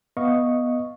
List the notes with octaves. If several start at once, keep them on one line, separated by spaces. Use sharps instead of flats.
B3 D#5 F5 C#6